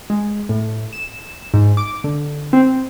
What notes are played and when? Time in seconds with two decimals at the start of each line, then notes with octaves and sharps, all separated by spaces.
0.10 G#3
0.49 A2
0.93 E7
1.54 G#2
1.77 D6
2.04 D3
2.53 C4